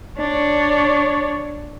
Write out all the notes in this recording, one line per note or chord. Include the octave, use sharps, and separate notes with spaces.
D4 C#5